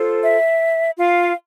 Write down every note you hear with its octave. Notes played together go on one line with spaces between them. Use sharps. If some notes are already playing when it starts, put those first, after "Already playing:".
Already playing: F4 A4 C5
E5
F4 F5